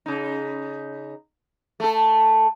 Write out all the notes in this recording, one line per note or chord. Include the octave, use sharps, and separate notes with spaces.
C#3 D#4
A3 A4